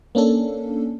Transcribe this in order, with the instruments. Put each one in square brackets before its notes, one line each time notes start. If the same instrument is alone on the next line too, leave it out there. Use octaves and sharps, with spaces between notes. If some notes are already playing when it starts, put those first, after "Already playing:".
[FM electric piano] A#3 C#4 D4 A4